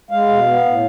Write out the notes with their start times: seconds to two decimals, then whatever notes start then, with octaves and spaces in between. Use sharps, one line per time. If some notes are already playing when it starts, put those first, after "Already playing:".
0.11 G#3 F5
0.29 B2
0.47 B3
0.65 A2